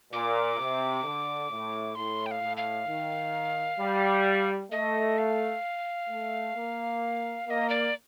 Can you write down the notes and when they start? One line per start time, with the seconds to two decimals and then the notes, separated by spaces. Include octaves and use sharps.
0.13 A#2 D6
0.58 C3
1.04 D3
1.51 A2
1.95 A2 C6
2.26 G5
2.31 F5
2.42 A2
2.57 F5
2.87 D#3
3.80 G3
4.71 A3 D#5
5.18 F5
6.10 A3
6.55 A#3
7.47 A#3 D#5 F5
7.70 D5